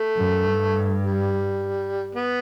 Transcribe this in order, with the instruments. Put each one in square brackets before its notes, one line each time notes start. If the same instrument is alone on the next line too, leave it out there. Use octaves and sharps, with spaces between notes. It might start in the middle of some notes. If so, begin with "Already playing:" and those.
Already playing: [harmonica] A3
[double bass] F#2
G2
[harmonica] G3
B3